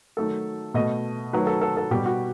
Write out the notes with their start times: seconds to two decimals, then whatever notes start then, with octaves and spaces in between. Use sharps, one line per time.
0.17 D#3 F#3 A3 A4
0.74 B2 A3 D#5
1.33 D#3 F#3 A3 B4
1.47 A4
1.61 A4
1.77 A4
1.91 B2 G3 G4
2.06 F#4